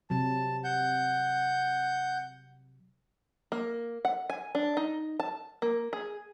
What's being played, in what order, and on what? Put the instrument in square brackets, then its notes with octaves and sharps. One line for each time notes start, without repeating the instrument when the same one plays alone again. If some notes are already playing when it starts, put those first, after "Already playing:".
[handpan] C3 F#3 [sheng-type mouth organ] A5
[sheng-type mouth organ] F#5 G6
[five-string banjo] A#3
F#5
G#5
D4
D#4
A5
A#3
G#4